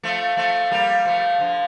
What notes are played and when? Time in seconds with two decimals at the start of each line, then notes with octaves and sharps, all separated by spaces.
0.03 F3 A3
0.37 F3 A3
0.71 G3 A#3
1.05 F3 A3
1.39 D3 F3